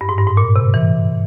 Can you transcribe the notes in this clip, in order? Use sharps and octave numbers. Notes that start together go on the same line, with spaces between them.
G2
G#2
G2
G#2
A#2
C3
E3